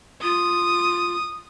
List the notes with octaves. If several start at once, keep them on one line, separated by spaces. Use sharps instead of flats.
F4 D#6